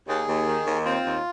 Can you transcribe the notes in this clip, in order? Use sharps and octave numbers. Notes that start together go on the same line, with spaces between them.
D#2 G#4
D#2
D#3
D#2
C4 F4
D#2